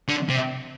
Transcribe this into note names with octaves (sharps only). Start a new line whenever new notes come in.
D3
C3